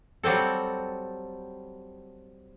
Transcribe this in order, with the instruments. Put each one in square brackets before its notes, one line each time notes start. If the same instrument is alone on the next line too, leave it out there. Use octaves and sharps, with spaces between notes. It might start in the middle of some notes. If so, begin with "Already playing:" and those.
[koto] F#3 G3 C4 A4